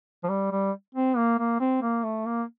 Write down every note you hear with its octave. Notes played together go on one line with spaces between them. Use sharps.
F3
G3
G3
C4
A#3
A#3
C4
A#3
A3
A#3